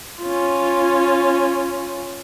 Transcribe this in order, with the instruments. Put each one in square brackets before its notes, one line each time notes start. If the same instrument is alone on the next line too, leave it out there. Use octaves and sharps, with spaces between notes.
[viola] C#4 F4